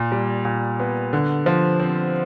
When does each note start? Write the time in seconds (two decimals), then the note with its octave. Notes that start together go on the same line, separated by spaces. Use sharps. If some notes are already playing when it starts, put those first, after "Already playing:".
Already playing: A#2
0.12 G3
0.45 A#2
0.79 B3
1.13 D3
1.46 F3
1.80 C4